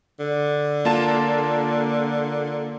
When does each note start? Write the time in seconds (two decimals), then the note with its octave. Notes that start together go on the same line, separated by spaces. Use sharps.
0.19 D3
0.85 A#3 F4 A5